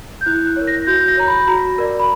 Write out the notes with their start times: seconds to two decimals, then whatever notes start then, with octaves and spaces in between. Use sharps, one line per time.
0.21 G6
0.26 E4 F#6
0.47 F#6
0.56 A#4 C#5
0.67 A#6
0.87 F#4 G6
1.08 A#6
1.17 C#5 A#5
1.27 B5
1.47 F#4 A#5
1.78 A#4 D5
1.99 B5